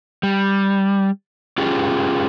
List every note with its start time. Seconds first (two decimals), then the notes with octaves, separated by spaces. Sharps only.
0.23 G3
1.58 C#4 F4 G4 G#4